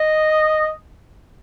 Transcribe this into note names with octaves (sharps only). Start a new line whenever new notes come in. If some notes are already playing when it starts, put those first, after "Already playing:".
Already playing: D#5